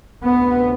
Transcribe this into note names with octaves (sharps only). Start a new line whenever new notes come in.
D2 C3 B3